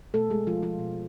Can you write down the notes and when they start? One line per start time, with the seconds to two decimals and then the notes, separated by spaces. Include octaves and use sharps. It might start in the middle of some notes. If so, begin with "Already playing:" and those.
0.14 B2 A3 A4
0.30 G#3 G#4
0.36 A3
0.47 F3 F4
0.57 A3
0.63 F3 F4
0.79 B2